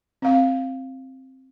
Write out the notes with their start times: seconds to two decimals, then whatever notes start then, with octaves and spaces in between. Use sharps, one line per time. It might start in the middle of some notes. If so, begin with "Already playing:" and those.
0.22 C4 F5